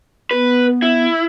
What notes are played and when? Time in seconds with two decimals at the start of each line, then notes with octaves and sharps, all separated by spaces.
0.31 B3 B4
0.82 E4